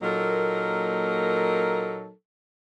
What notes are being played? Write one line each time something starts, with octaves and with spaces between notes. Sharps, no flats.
A#2 F#3 A#3 D#4 A4 A#4